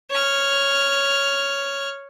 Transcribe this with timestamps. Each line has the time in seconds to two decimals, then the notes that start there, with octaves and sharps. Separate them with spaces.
0.11 C#5 F6